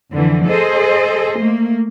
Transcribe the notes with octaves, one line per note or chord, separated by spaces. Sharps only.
F2 D3 E3 F3
G#4 A4 C5 D#5
A3 A#3